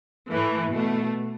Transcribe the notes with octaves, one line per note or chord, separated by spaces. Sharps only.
A2 E3 A3
B2 A3